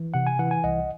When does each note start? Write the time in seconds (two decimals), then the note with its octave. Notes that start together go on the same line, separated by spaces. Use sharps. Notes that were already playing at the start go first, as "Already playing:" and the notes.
Already playing: E3
0.14 C3 F#5
0.27 G#5
0.39 E3 F#5
0.51 G#5
0.64 C2 D#5 F#5